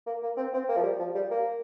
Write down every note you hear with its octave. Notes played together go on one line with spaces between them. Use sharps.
A#3
A#3
C4
C4
A#3
F3
G3
F3
G3
A#3